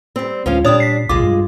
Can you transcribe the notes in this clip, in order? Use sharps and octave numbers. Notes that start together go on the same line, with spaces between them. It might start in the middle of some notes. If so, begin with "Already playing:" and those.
G3 C4
D2 F3 G#3 C#4 D4 F5
A#2 G3 D4 C#5 D#6
B6 C7
A#1 D#2 B2 G#3 F4 D6
G2 G3